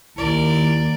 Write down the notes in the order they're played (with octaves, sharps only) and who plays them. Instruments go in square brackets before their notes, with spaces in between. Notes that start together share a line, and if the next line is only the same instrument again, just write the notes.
[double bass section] D#2 [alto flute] E4 [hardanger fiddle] A#4 D5